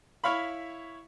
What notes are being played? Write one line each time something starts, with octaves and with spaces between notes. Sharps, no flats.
E4 C#5 F5 B5